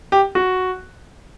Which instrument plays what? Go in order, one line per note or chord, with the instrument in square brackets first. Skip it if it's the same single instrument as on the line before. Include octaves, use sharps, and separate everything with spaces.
[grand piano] G4
F#4